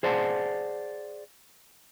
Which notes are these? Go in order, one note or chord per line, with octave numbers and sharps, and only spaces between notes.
G#4 C5 D5 F#5 A5